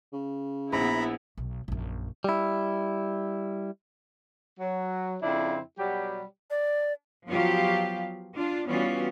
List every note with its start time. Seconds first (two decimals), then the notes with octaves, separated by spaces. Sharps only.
0.13 C#3
0.73 A#1 B3 E4 A#5 B5
1.38 B1
1.68 A#1 F#2
2.24 G3 E4
4.59 F#3
5.22 F2 C#3 C4 D4 E4
5.78 B2 F#3 G3 G4
6.50 D5
7.27 F3 F#3 B3 F4 G4 F5
8.35 D4 F4
8.69 E3 G3 B3 C#4 F4 F#4